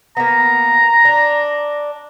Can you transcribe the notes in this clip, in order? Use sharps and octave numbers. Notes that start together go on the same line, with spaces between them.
A#3 B3 A#5
D4